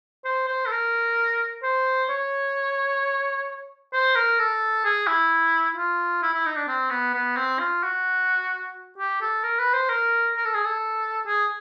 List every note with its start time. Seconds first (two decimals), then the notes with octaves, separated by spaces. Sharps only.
0.25 C5
0.48 C5
0.66 A4
0.72 A#4
1.63 C5
2.10 C#5
3.93 C5
4.16 A#4
4.39 A4
4.85 G#4
5.07 E4
5.77 F4
6.23 E4
6.33 E4
6.46 D#4
6.57 D4
6.68 C4
6.91 B3
7.14 B3
7.36 C4
7.59 F4
7.83 F#4
8.98 G4
9.21 A4
9.43 A#4
9.59 B4
9.74 C5
9.90 A#4
10.36 A#4
10.45 A4
10.55 G#4
10.65 A4
11.27 G#4